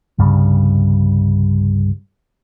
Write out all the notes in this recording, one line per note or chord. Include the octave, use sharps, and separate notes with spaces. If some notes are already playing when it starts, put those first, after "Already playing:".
C2 G2 C#3 G3